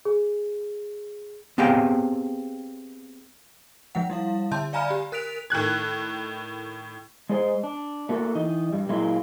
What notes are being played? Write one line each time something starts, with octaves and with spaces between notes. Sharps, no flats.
G#4
B3 C4 G4 G#4 F5 G5
F3 G#3 F#5
G3 E4 F5
D3 E5 A5 C6 G6
D5 F5 G#5 A#5 B5 F6
G4
A#4 F#6 B6 D7 F7
A2 D#3 F#6 G#6
G#3 G#4 C5 D#5
D4
A3 A#3 F#4 G4 A4
E3 D#4 D#5
G2 G3
A#2 F#3 G#3 A#3 E4 F4